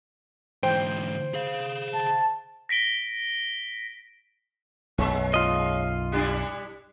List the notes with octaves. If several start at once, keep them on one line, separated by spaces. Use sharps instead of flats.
G#2 E3 C5 G5
G#4 F5
A5
A#6 B6 D7 G7
B1 F#2 G#3 C#5 E5
F4 D#5
G3 D4 E4